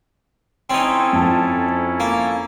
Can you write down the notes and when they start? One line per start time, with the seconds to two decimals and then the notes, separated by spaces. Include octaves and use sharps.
0.70 C4 C#4 D#4 E4 A4
1.13 F2 A5
2.00 A#3